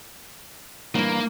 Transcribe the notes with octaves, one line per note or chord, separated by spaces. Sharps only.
G2 E3 A#3